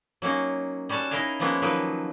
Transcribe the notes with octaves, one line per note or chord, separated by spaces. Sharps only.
F#3 A#3 C#4 D#4
G3 C#4 F#4 A5
D#4 E4 A#4 D#5 F5 G#5
F3 G#3 A#3 B3 C#4 E4
D#3 F3 F#3 A#3 D#4 B4